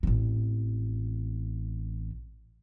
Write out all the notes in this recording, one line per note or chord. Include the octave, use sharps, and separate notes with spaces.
A1 C4